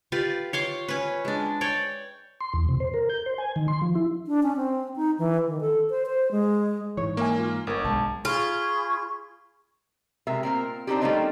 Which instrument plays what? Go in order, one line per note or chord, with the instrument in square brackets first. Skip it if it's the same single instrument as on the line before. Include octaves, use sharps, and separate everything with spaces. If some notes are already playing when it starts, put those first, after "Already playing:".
[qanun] F4 G4 B4 D5
C#5 C6 D6
C#4 B4
G#3 D4
C#5 D5 G5
[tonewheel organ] C6
E2
C3
C5
A#4
G6
C5
G#5
D#3
C6
F3
E4
[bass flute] D4
C#4
C4
D#4
E3
D#3
A4
C5
C5
G#3
[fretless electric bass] G#2 E3 [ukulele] C#5
[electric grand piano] A#3 [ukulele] C#4 E5 G#5
[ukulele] F4
[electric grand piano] G1 [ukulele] A#4 C#5
[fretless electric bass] B1 G#3 [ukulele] A5
[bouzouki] F4 [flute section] G#4 B5 C#6
[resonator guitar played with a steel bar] C3 G#3 A#4 E5
A#2 C4 A#4
C4 D4 D#4 F#4 G4
G3 A3 A#3 C4 C#4 D#4